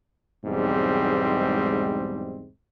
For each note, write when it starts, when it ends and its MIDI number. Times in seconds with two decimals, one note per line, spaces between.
0.46 2.50 35
0.46 2.50 40
0.46 2.50 44
0.46 2.50 55
0.46 2.50 56
0.46 2.50 60